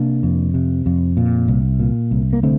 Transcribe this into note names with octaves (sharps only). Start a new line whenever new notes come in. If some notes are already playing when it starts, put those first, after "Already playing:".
Already playing: C3 A#3 D4
F2
C3
F2
A#2
C2
A#2
C2
A#3
D3 A3 C4